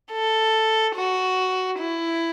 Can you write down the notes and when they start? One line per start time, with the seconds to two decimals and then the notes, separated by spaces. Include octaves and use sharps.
0.12 A4
0.95 F#4
1.79 E4